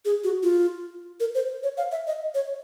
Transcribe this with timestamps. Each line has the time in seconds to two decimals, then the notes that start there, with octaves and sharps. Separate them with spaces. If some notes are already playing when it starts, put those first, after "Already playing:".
0.05 G#4
0.24 F#4
0.43 F4
1.20 A#4
1.35 C5
1.63 C#5
1.77 F5
1.92 E5
2.07 D#5
2.35 C#5